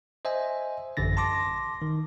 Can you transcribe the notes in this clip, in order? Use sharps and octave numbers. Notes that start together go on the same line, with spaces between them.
C5 D#5 E5 G#5
A1 F#2 D3 A6 A#6
A5 C6 D6 A#6
D#3